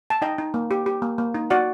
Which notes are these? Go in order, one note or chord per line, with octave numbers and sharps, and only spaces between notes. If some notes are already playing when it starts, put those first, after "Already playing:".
A5
D#4 D#5 G5
D#4
A#3
G4
G4
A#3
A#3
D#4
F#4 D5 F#5